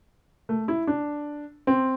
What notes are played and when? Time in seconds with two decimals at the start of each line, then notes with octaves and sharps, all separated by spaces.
0.49 A3
0.68 E4
0.87 D4
1.67 C4